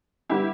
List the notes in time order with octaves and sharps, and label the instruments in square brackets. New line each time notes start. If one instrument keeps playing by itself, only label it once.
[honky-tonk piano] D3 G3 B3 E4 G4